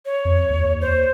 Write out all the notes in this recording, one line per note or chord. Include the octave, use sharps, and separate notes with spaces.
C#5
F2
D#2
C5